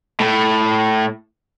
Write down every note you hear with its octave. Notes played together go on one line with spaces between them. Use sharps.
A2